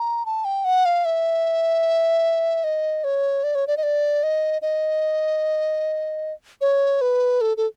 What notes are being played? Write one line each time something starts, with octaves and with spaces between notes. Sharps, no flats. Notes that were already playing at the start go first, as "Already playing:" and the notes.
Already playing: A#5
A5
G5
F#5
F5
E5
D#5
C#5
D5
C#5
D5
D#5
D5
D#5
D#5
C#5
B4
A4
A4